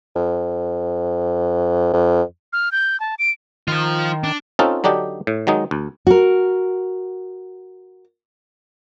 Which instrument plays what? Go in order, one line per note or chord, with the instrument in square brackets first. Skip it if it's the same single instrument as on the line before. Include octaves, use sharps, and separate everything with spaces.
[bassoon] F2
F2
[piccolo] F6
G6
A5
D7
[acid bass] D#3 [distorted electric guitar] F3 F4
[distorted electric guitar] D4
[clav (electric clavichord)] C4 C#4 D#4 F4 A4
D3 F#3 D4 D#4 G4
A2
D#3 F#3 G#3 D#4
D2
[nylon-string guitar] F#4 A#4